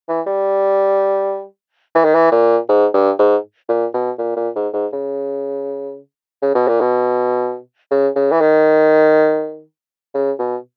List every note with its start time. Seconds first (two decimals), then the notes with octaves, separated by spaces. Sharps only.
0.09 E3
0.27 G3
1.95 E3
2.04 D#3
2.15 E3
2.32 A#2
2.69 G#2
2.94 G2
3.19 G#2
3.69 A#2
3.94 B2
4.19 A#2
4.37 A#2
4.55 G#2
4.74 G#2
4.93 C#3
6.42 C#3
6.55 B2
6.68 A#2
6.81 B2
7.91 C#3
8.16 C#3
8.32 E3
8.41 D#3
10.14 C#3
10.39 B2